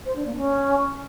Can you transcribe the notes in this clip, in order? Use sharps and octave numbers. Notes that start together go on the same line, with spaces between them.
C5
D4
A#3
C#4